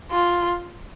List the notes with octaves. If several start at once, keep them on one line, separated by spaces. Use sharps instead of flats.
F4